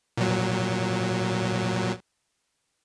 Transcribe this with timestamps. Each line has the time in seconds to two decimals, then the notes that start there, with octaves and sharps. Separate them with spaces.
0.17 A#2 F#3